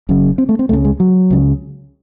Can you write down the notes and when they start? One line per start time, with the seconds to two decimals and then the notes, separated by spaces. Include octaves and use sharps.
0.09 F#1 F#2 C#3
0.38 C4
0.49 A3
0.59 C4
0.69 C#2 C#3 A3
0.85 G#3
1.00 F#3
1.30 C#2 C#3